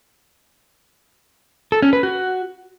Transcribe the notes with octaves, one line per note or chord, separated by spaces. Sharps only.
A4
C#4
B4
F#4